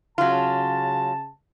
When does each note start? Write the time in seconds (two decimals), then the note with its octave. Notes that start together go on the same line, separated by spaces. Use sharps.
0.18 C#3 F#3 F4 A5